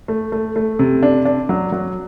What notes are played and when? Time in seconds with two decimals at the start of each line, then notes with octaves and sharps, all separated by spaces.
0.08 A3
0.32 A3
0.56 A3
0.79 C3
1.03 D4
1.25 D4
1.49 F#3
1.72 F#3